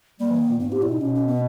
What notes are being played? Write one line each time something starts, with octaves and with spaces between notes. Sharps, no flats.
G3 A#3
E3
D#3
A#2
G2 B3
G#2 G4
A#2 E4
B2 D#4
B2 C#4
C#4
B3